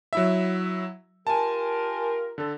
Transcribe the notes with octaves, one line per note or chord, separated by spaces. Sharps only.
F#3 E4 E5
F4 G4 A#4 G#5 A5
D3 A4